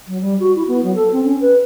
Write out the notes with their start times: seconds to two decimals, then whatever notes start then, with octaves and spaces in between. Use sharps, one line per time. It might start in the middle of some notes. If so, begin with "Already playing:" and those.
0.07 F#3
0.20 G3
0.38 F#4
0.55 E4
0.67 B3
0.83 F#3
0.95 A4
1.12 C4
1.24 C#4
1.40 B4